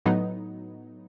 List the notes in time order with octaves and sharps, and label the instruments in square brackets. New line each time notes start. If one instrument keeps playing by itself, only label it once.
[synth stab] A2 F#3 B3 D#4